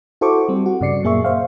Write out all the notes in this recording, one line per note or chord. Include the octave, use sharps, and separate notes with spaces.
E4 F#4 A4 C5 C#6 D6
G3 C4
F#4
G2 C#3 D5 C7 C#7
F#2 A#2 A#3 G#4 E5 C#6
C5 E5 F5